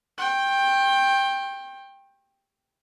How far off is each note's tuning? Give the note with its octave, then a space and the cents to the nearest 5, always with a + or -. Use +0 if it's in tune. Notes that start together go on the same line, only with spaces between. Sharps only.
G5 +10 C#6 -45